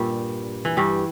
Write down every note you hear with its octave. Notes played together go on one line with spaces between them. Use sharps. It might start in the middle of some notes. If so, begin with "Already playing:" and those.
Already playing: G2 A#2 G3
E3
G2 G3